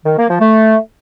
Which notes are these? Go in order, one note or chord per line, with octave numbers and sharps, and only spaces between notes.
D#3
A#3
F3
A3